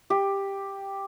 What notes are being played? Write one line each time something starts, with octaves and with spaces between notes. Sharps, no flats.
G4